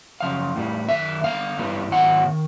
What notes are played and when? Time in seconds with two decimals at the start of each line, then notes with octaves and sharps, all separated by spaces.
0.20 F#2 C#3 F3 F5
0.55 A2 E3 G3
0.88 F#2 D#3 E5
1.23 D3 G3 B3 F5
1.58 G2 E3 G3 B3
1.91 G#2 D#3 F#3 B3 F#5
2.26 D#3